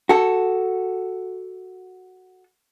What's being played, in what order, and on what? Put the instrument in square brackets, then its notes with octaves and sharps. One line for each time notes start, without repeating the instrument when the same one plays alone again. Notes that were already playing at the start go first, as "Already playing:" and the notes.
[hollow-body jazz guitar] F#4 A4